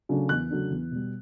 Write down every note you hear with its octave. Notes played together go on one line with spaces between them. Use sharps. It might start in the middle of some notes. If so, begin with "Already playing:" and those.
C#3 F#3 A3 D4
E2 F#6
C#3 F#3 A3 D4
E2
B2 G3